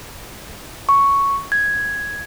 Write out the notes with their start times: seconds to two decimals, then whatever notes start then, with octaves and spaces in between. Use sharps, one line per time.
0.89 C#6
1.52 G#6